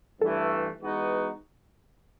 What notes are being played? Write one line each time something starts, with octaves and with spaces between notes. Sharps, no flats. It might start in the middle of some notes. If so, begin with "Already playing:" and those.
G2 E3 A3 A4
E3 G#3 B3 D#4 F#4